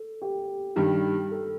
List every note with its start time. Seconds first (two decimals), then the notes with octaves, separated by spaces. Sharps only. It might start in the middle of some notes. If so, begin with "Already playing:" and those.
Already playing: A4
0.22 G4
0.76 G2 D#3 G3
1.31 A4